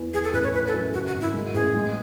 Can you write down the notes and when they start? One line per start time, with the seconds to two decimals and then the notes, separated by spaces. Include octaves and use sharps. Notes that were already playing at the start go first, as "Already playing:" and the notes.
Already playing: E2
0.14 E3 G#4
0.24 A4
0.33 A1 B4
0.44 C#5
0.54 E3 B4
0.67 A4
0.74 F#2
0.94 C#3 F#4
1.07 F#4
1.15 G#1
1.21 E4
1.34 G#3
1.54 A1 G#4
1.74 G#3